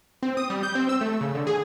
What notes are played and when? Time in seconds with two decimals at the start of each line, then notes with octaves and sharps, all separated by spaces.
0.22 C4
0.37 D#6
0.50 G3
0.63 G6
0.75 C4
0.89 E6
1.01 A3
1.21 C#3
1.35 D3
1.47 G#4